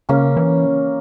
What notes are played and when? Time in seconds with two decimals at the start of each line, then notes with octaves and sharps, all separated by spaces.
0.09 C#3 A#3 C#4
0.37 E3